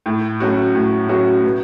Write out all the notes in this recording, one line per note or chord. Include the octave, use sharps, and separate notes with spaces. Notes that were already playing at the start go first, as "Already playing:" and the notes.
A2
F#3 A3 C#4 F#4
A2
F#3 A3 C#4 F#4
B2